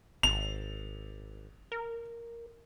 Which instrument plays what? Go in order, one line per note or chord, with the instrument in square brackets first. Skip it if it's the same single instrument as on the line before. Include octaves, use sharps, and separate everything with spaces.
[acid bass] G#1 [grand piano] F7
[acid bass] A#4